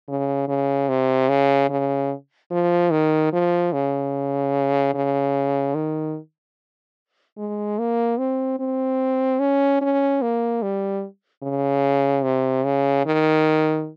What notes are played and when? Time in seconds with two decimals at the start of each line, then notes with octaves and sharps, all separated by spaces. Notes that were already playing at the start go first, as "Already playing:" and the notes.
0.08 C#3
0.48 C#3
0.89 C3
1.29 C#3
1.70 C#3
2.51 F3
2.91 D#3
3.33 F3
3.73 C#3
4.94 C#3
5.75 D#3
7.38 G#3
7.79 A#3
8.18 C4
8.59 C4
9.40 C#4
9.81 C#4
10.22 A#3
10.62 G3
11.43 C#3
12.24 C3
12.65 C#3
13.06 D#3